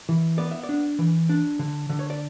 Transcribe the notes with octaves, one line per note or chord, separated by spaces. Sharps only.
E3
B3 D5
E5
D5
D4
E3
D4
D3
D3
C#5
D5